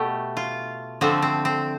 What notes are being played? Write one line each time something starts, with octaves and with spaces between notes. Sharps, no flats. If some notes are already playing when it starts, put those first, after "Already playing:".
Already playing: B2 A3 G4
F4
D3 F3 A3 C4
C4
C4